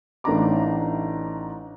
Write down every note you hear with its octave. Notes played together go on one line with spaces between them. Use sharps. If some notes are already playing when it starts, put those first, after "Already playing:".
A1 A2 D4 D#4 A#5 D6